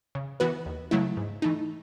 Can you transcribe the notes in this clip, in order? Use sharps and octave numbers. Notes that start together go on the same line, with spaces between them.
C#3
E3 B3 F#4 B4
D#2
C#3 F#3 A3 E4
G#2
E3 A3 D#4